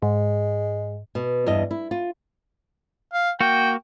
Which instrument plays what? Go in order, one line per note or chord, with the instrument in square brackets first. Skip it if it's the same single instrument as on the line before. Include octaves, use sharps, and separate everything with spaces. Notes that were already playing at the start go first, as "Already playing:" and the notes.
[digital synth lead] G#2 [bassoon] G#3
[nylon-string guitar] B2
E2 G2 D#5
E4
F4
[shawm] F5
[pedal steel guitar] A#3 F#4 [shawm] G5